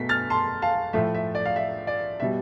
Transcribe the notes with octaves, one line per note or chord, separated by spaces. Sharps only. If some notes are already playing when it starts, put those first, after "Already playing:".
Already playing: B2 A3 B6
F6 A6
A5 C6
F5 A5
A2 F3 A3 E5
E5
D5
F5
E5
D5
B2 G3 E5